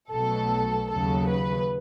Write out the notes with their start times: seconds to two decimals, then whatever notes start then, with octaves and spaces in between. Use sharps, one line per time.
0.12 B1 B2 F#3 A3 A4
0.91 D#2 C#3 F#3 A4
1.30 B4